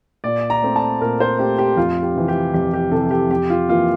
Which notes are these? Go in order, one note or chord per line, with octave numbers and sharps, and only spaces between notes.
A#2 D5
A#5
A3 C4
A5
A#2 A#4
C5
A3 C4 G4
G4
F2 F4
G4
C3 E3
G4
F2 G4
G4
C3 E3 A4
G4
F2 G4
F4
E3 A#3 F4